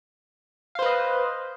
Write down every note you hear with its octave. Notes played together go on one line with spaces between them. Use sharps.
B4 C5 D#5 F5